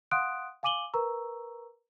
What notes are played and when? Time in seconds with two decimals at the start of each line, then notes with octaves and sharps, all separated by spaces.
0.11 F5 F#5 C6 D#6 F#6 D7
0.63 F5 G#5 D6 D#7 F#7 G7
0.94 A#4 B4 A#5 C#6 E6